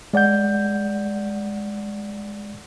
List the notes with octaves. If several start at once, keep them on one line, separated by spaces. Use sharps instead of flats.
G#3 D5 F#5 G6